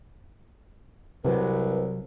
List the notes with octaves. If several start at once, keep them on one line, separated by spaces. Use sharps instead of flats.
C2 C3 F#3 B4